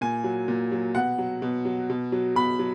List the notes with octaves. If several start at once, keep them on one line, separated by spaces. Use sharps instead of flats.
A#2 G#5
F#3
A#2
F#3
B2 F#5
F#3
B2
F#3
B2
F#3
B2 B5
F#3